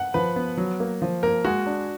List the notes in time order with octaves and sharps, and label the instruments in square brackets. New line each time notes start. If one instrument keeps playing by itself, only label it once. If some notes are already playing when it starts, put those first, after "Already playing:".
Already playing: [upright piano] F#5
[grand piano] F3 [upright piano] B4
[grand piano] B3
F#3
A#3
F3
[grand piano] A#3 [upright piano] A#4
[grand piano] G#3 [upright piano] F#4
[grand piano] D4